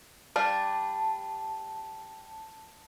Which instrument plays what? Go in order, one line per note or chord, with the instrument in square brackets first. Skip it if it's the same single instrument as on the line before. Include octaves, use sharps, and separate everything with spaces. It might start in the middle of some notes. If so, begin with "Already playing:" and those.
[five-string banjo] G3 D4 F5 [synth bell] A5